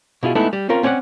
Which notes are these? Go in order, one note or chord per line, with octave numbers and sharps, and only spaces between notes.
B2 E4 F4 G#4
G#3 A3 B3 D#4 E4 A4
G3
C4 C#4 F4 A#4
C4 C#4 D5 E5 F#5